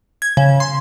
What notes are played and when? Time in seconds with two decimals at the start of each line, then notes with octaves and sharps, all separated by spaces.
0.22 G#6
0.37 C#3
0.60 C6